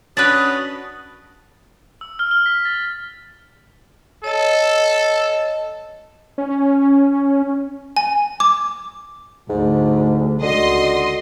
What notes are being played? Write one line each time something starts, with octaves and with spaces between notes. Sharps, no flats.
C#4 D4 F#4 B4 B5 D#6 F#6 A6
E6
F6
G7
B6
A6
A4 C#5 D#5 A5
C#4
G#5
D6
D2 G#2
C#2 D3 F#4 D#5 C6